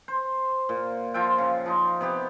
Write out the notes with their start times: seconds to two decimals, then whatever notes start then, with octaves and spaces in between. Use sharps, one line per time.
0.08 C5
0.69 A#2
1.14 F3 F4 E5 G5
1.38 C#3
1.66 F3 D#4
2.01 C3 B3 G4